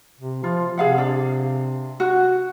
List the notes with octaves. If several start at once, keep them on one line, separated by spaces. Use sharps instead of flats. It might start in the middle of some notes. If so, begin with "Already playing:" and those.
C3
F3 F4
C3 G#4 F5 F#5
D4
F#4